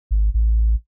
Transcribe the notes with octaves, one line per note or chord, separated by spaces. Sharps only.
G#1
A1